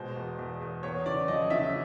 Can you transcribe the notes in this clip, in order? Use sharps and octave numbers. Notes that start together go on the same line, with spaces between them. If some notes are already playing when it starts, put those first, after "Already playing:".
Already playing: B2 G#3 C5
E2
E2
E2
E2 C#5
C#3 D5
F3 D#5
C#3 E5